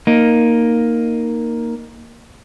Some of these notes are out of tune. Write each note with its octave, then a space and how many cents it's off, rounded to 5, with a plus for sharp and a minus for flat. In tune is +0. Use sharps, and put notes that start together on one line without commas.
A#3 +0 D#4 +0